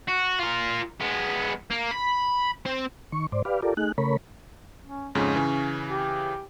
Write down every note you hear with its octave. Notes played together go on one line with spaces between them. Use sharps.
F#4
F4 A#4
G#3 B3
A#3
B5
C4 C5
D#3 C#6
G#2 C5 D5
G4 B4 D5 F5
F4 G4 A4 A#4 D5
A3 D#4 G#4 F#6
C#3 A3 A#4 C#5 B5
C#4
F2 G#2 C#3 C#4
C#3 E3
G4